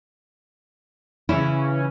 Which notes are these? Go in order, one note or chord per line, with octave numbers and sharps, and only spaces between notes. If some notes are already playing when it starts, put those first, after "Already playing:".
C#3 E3 C#4 E4